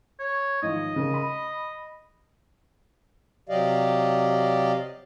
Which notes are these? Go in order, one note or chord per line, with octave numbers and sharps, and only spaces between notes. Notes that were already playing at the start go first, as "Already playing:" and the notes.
C#5
G#2 D#3 F3 D#5
C#3 A#4
B5
C3 F#3 G4 D5 D#5 F5